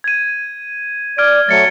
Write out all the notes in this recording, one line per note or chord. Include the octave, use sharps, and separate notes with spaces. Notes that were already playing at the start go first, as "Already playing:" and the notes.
G#6 D#7
D5 F6 G#6 D7
F#3 A3 A6 C#7